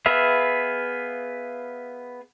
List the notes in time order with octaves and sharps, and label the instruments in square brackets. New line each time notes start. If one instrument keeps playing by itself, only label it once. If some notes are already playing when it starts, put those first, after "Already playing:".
[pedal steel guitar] B3 G#4 B4 E5 F5